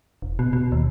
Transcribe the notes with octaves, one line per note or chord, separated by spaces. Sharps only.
E1
B2
B2
D#2